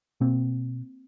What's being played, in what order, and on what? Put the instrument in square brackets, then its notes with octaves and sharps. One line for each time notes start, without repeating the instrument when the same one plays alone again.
[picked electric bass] B2 A#3 C4